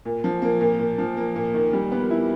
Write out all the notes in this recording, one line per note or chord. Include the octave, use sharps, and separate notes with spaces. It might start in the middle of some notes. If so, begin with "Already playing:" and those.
A#2
F3
A#3
A#2
A#2
F3
A#3
A#2
D#3
G3
B3
E4